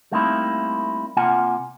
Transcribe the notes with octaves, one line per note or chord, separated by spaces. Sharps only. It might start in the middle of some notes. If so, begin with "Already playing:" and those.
G3 A3 A#3 C4 D#4 E4
C3 A#3 F4 F#5 G#5